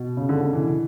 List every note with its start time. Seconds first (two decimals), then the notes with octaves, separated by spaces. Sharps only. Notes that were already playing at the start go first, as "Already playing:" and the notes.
Already playing: B2
0.17 C#3
0.29 D3
0.40 D3
0.53 E3